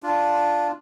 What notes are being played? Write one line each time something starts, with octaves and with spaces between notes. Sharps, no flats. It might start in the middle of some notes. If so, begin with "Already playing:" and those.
D4 F4